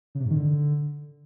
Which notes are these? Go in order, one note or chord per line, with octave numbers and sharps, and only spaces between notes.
C#3
C3
G#2
D#3
D3